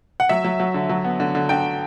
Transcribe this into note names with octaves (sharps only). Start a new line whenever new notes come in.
F#5
F#3 E5
F#3
F#3
D3
F#3
B3
D3
D3
D3 G5